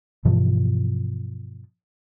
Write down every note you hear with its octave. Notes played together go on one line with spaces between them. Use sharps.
G2 B2 E3 F3